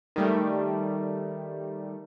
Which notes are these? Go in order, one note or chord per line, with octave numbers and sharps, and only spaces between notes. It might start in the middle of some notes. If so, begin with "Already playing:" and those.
D#3 G3 A3